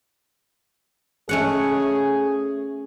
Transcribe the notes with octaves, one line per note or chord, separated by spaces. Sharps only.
A3 C#4 G#4 F#5